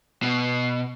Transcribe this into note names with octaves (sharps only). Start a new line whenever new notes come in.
B2